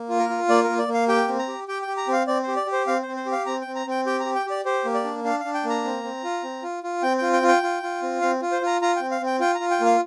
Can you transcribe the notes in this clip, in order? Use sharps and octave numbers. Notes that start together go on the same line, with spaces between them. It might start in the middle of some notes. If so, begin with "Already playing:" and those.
Already playing: A#3
F4
A#4
F4
A#3 D5
A#4
A#3
D5
A#3
F5
G4 G5
C4
A#5
G4
G4 G5
G5
G4
A#5
C4 F5
C4 D5
C5
G4
D5
G4
C5
C4 F5
C4 C5
C5
G4
F5
C4 A#5
C4 G5
A#5
C4 G5
G4 G5
G4 A#5
G5
G4 D5
G4 C5
A#3
D5
D4
D4 F5
F5
D4
G5
A#3
A#5
C4
C4
F4
C4
F4
F4
C4 G5
F4 G5
G5
F4
G5
F4
F4
C4
C4 F5
F4
C5
F4 A#5
F4 A#5
C4 G5
F5
C4 G5
F4 G5
A#5
F4
G5
A#3
F5